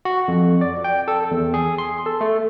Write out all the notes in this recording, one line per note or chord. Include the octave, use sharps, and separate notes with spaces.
F#4
F2
D5
G5
A4
E2
G#4
C6
A4
A3